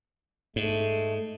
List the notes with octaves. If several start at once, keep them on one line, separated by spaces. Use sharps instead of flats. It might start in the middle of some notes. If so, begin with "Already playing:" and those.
G#2 A3